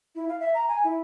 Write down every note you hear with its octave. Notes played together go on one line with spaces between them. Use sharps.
E4
F5
E5
A#5
G#5
E4